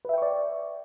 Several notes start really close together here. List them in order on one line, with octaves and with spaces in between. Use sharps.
B4 E5 G5 C#6 D5